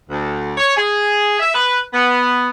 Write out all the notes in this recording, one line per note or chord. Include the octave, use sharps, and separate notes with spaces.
D2
C#5
G#4
E5
B4
B3